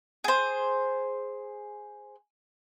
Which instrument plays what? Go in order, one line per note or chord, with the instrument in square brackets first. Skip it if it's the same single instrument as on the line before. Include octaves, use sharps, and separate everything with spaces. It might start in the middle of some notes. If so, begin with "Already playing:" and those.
[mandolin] G#4 C5